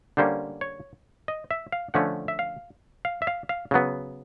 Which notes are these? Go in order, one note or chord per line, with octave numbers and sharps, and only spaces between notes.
D3 G3 A#3 C#4 C5
C#5
D#5
E5
F5
D3 F3 A3 C#4 F#5
E5
F5
F5
E5
F5
F5
C#3 F#3 B3